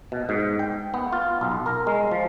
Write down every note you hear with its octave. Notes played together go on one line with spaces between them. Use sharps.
B2
G#2
G5
B3
F4
B1
A#4
G#3
F3